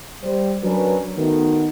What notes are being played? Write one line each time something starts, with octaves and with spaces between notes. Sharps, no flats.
G3 C5
F#3 C#4 D4 A#4 B4
D#3 A3 B3 F#4